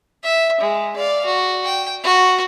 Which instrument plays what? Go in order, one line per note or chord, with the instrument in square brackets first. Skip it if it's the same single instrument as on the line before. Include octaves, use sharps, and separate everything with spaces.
[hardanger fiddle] E5
G#3
D5 F5
F#4
G5
F#4